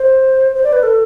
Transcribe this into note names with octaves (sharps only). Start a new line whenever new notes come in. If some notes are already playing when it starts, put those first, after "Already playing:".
Already playing: C5
C5
D5
B4
A4